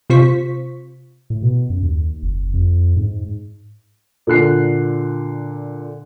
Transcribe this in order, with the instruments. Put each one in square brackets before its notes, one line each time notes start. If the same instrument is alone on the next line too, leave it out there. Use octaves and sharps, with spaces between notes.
[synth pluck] C3 F4 C5 C#6 B6
[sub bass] A2
B2
F#2
D#2
F#1
F2
G#2
[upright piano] A#2 D3 F#6 C7